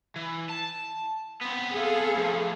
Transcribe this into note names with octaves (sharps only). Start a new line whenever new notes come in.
E3
A5
B3 C4
G#4 A4 F5
A2 F3